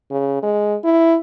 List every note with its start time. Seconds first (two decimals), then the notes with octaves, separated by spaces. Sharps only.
0.11 C#3
0.43 G#3
0.84 E4